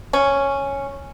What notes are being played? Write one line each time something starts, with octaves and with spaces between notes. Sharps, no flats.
C#4